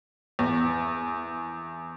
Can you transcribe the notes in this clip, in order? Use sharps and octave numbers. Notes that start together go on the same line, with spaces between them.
E2